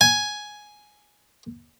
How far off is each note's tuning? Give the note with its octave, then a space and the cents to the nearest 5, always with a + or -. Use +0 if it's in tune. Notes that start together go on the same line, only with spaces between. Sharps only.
G#5 +5